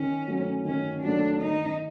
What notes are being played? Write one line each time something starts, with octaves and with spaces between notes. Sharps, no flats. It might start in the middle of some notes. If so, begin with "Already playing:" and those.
Already playing: D#3 C#4
F#3 A3
D#3 C#4
F#3 A3 D4
D#3 D#4